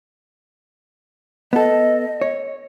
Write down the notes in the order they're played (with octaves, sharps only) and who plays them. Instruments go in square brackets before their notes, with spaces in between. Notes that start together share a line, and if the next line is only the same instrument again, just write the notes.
[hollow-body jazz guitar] B3 A4 [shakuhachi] D#5
[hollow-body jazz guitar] C#5